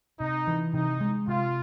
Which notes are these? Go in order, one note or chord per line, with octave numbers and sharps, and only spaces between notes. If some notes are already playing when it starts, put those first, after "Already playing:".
C3 D#4
E3
C3 D#4
G#3
C3 F4